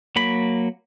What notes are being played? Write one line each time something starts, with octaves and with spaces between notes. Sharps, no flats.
F#3 A#3 B5